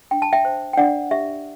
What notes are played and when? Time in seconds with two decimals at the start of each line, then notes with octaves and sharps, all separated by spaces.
0.11 D4 G5
0.22 A5
0.33 E5 G5
0.45 C5
0.73 G5
0.78 D4 D5 F#5
1.11 G4 E5